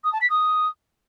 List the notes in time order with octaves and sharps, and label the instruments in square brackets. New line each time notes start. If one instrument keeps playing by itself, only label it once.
[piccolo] D#6
A5
B6
D#6